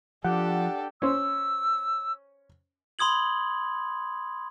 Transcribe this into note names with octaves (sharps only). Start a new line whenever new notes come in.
F3 D4 G4 A4 F#5
C#4 C5 E6
B5 C6 D#6 G#6 F#7